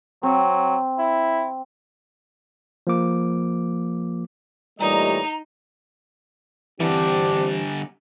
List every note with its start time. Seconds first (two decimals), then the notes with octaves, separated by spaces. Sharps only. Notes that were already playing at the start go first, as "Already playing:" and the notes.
0.23 F#3 C4
0.99 E4
2.87 F3 A#3 D6
4.80 A#2 E3 G3 A3 D#4 C#5 D#5 A#5
6.80 D3 E3 G3 C4 D4 G4